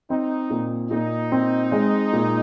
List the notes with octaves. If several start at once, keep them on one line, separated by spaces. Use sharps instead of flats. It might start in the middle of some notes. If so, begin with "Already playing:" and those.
C4 D#4
A#2
A#2 D#4
C4
G#3
A#2